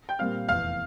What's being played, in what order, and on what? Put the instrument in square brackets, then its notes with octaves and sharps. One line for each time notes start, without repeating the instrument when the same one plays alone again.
[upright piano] G5 G6
[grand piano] A#2 G3 C4 [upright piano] F5 F6
[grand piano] F1 E2 E3 [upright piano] F5 F6